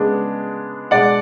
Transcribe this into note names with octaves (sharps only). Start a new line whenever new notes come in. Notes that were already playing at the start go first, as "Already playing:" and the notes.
Already playing: C#3 G#3 B3 D4
B2 G#3 D4 D5 F#5